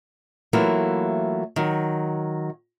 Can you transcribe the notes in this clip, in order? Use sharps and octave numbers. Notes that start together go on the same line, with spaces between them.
E3 F#3 A3 A#3 E4 F4
D#3 F#3